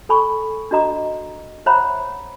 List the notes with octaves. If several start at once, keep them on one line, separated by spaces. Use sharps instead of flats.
A4 G#5 B5 C#6
D4 F#4 D#5 A#5 D6
C5 C#5 E5 F#5 A#5 B5